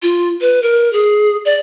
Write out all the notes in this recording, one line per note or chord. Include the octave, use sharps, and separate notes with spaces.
F4
B4
A#4
G#4
D5